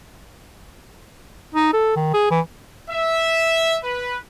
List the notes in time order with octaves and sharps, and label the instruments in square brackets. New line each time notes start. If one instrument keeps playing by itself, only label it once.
[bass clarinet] D#4
A4
D#3
G#4
E3
[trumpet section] E5
B4